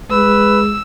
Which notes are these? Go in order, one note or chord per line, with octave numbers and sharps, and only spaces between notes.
G#3 B4 E6